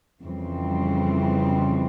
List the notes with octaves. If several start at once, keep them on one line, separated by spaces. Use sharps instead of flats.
F2 C#3 E3 G3 C4